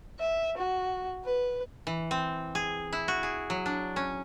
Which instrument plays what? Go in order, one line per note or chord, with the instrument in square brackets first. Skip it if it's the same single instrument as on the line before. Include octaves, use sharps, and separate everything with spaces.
[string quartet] E5
F#4
B4
[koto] E3
C4
G#4
E4
F#4
G#4
F#3
D4
C#4